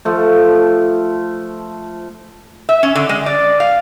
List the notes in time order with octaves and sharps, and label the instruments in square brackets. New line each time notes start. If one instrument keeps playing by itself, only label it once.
[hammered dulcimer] F3 A3
[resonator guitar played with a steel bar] E5
C#4
D3
G#3
D5
F5